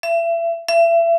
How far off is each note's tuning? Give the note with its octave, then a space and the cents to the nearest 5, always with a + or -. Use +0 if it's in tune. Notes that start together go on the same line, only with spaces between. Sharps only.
E5 +30
E5 +30